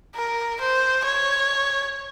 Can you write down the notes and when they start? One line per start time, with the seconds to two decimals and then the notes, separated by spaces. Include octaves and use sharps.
0.15 A#4
0.61 C5
1.05 C#5